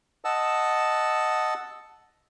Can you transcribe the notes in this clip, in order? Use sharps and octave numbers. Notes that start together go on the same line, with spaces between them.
D#5 F#5 A5 E6